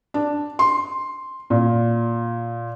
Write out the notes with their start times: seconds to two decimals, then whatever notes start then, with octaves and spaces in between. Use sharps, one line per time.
0.14 D4
0.59 C6
1.50 A#2